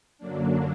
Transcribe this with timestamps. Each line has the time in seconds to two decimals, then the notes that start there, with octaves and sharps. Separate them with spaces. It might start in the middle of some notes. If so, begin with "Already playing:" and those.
0.18 F#2 D3 F#3 A#3 D4